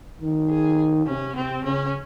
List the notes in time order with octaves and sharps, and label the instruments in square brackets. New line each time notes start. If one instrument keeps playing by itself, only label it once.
[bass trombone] D#3
[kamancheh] G#4
[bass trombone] C3 [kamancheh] C#4
[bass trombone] C3 [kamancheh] C4
[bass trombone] C#3 [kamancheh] C#4